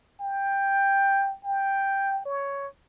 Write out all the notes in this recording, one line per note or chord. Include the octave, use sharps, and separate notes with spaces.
G5
G5
C#5